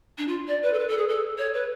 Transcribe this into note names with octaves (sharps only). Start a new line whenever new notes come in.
D4
F4
D5
B4
A4
B4
A4
G#4
A4
C#5
B4